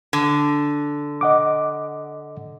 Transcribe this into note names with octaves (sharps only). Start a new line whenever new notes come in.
D3
D#5 F#5 D6